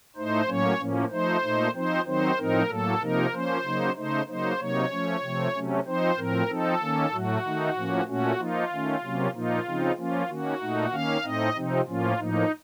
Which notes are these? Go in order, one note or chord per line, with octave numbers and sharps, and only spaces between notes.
A2 A3 D#4 C5
A2 F#3 A#3 C#4 C#5
A2 F3 A#3 C#4
F3 A3 D#4 C5
A#2 A3 D#4
F3 C4 D#4 C5
D#3 F#3 C4 D#4 C5
A2 F3 C4 D#4 A#4
A2 F#3 A#3 A4
C3 F3 A#3 D#4 A#4
F3 A#3 C#4 C5
C#3 F#3 A#3 D#4
C#3 A3 D#4 C5
C#3 F#3 A#3 D#4 C5
C3 F#3 A#3 D#4 C#5
F3 A3 C#4
C3 F3 A3 C4
C3 F#3 A3 C#4
F3 C4 D#4 C5
A2 F3 C4 A#4
F3 C4 D#4 A4
D#3 A#3 C#4
A2 F#3 A3 F#4
D#3 A3 D#4
A2 F3 A#3 C#4
A#2 A3 C#4 F#4
F3 A#3 D#4 F4
D#3 A3 C#4
C3 F#3 A#3 C#4
A#2 F3 A#3 D#4 F4
C#3 F3 C4 D#4
F3 A#3 C#4 F4
D#3 A#3 C#4 F#4
A#2 A3 D#4
D#3 A#3 C#4 F5
A2 A3 C4 D#4 D#5
C3 F3 C4 D#4
A2 F3 A#3 C#4 F4
A2 F3 A#3 D#4